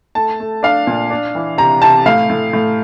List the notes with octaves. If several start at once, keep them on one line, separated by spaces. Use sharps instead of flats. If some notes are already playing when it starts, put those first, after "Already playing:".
A3 A5
A3
D4 F5
A#2
D4
E3
C3 A#5
C3 A5
A2 F5
A2
A2